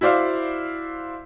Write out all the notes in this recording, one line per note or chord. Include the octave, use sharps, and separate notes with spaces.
E4 F#4 C5 D5 F5